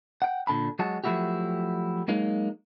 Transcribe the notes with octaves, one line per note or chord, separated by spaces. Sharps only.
F#5 G5
A#2 D3 A5 B5
F#3 G#3 F#4 A5
F3 F#3 A3 E4 F#4 G4
F#3 G#3 A#3 D#4